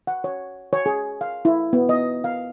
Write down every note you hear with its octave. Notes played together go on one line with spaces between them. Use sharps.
F#5
C#5
C#5
G#4
F5
E4
B3
D#5
F5